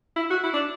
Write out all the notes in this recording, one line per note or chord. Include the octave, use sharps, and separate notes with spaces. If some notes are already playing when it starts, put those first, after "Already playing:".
E4
F#4
E4
D4